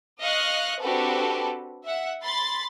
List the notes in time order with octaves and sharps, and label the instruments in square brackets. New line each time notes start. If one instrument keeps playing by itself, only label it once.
[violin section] D#5 F5 C#6 F6 F#6
C4 D4 F#4 G4 A4 B4
E5 F#5
B5 C6 A6